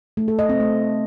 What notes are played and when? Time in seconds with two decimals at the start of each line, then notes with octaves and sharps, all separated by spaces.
0.17 A3
0.28 A4
0.39 D#5
0.49 C4
0.60 A3